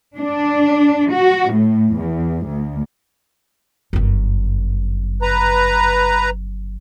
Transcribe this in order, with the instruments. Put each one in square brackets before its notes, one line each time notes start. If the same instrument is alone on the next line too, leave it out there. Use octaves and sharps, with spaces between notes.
[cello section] D4
F#4
A2
E2
D2
[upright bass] G1 F#2
[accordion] B4 A#5